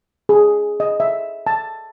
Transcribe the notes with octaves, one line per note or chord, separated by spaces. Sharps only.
G#4
D#5
E5
A5